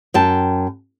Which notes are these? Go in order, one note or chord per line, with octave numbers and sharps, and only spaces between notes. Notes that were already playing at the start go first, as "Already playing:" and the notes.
F#2 G5 A5